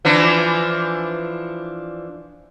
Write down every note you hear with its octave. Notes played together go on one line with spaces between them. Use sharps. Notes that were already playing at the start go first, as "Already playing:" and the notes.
E3 F3 D4